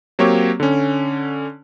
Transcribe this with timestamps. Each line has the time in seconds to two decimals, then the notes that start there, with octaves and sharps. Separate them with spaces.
0.19 F#3 A#3 C4 G4 C#5
0.60 D3 C#4